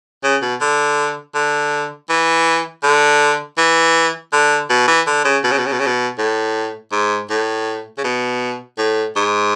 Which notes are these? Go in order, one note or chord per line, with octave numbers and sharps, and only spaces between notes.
C#3
B2
D3
D3
E3
D3
E3
D3
B2
E3
D3
C#3
B2
C#3
B2
C#3
B2
C#3
B2
A2
G#2
A2
C#3
B2
A2
G#2